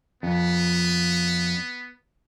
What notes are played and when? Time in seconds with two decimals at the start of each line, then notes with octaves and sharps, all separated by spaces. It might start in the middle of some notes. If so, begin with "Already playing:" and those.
0.23 F2 B3